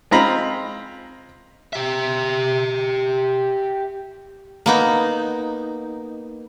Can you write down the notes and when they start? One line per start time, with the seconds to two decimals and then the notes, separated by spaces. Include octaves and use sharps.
0.11 G#3 C4 F4 A#5 B5
1.73 G4 E5
4.66 A#3 B3 D#4